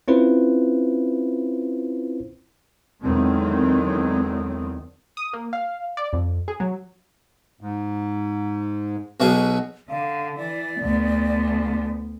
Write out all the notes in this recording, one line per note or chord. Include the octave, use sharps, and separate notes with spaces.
C4 C#4 E4 F4 B4 C5
E2 D3 D#3 F#3 G#3 C4
D#6
A#3
F5
D5
F2
G#4
F#3
G#2
B1 B2 G#4
D3 F5
E3 D5
D2 B3